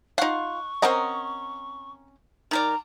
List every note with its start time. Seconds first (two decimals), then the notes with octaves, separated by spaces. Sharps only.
0.18 D#4 F4 F5 F#5 C#6
0.82 C4 C#4 A#4 D#5 F#5 A#5
2.51 D#3 A#4 D5 A#5